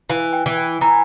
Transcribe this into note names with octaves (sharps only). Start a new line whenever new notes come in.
E3 F5
G5
E3
G5
E3 A#5